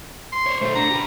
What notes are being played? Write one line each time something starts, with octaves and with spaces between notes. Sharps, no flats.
C6
C5 C#5
B2 A3 C5
D3 A#5
G4 B4